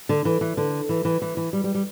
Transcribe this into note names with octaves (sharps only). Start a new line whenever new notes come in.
D3
E3
E3
D3
E3
E3
E3
E3
G3
G3
G3